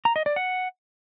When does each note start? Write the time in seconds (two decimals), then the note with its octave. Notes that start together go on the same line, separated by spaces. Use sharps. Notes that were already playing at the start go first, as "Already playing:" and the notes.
0.05 A#5
0.16 D#5
0.26 D5
0.36 F#5